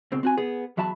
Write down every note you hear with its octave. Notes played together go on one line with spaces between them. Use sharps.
C#2 B2 C4
C4 F#4 G#5
B3 G#4
E2 F#3 E5 A5 B5